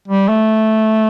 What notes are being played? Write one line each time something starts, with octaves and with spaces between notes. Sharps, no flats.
G3
A3